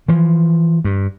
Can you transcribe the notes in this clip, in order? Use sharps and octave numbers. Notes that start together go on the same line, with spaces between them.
E3 F3
G2